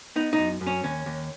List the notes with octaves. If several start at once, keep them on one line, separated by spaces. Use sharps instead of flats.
B3 D#4
D#4
F#2
F#2
C#4
D#2 C#4
D#2